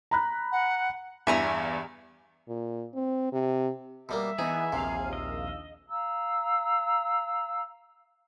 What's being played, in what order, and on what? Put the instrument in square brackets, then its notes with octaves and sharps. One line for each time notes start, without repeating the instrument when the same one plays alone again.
[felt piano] A#5 B5 F#6
[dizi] F#5
[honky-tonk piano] E2 G2 E3 [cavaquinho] E5 G#5 A#5
[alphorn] A#2
C4
C3
[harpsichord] B2 G3 A#3 [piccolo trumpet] E5
[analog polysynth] E3 B3 [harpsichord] D#4 [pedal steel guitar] G#4
[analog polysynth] A#1 D#2 F5 [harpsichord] C3
[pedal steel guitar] D#5 [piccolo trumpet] E6
[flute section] F5 A#5 E6